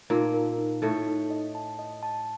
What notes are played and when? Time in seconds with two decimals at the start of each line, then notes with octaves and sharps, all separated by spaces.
0.10 A#2 A#3 D#4
0.34 A#4
0.58 D#4
0.82 A2 A3 D#4
1.07 D#4
1.30 D#5
1.55 A5
1.79 D#5
2.03 A5